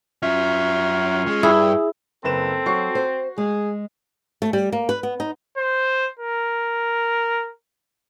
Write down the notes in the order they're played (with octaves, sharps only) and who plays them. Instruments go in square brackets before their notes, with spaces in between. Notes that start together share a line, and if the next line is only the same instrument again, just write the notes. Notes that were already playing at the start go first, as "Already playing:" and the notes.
[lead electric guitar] F#2 E5 [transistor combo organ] C#4 F4
[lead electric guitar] G#3
[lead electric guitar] G2 [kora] E4 [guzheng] G#4
[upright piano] F#1 B4 E7 [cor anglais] C4 [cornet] A4
[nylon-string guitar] F#3 [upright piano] F#4 C#6 C7
[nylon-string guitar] C5
[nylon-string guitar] G#3 [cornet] G#4
[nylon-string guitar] A3
G3
A#3
B4
B3
D#4
[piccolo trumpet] C5
A#4